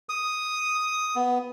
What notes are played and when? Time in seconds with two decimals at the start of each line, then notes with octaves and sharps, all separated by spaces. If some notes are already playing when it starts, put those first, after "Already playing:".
0.09 D#6
1.16 B3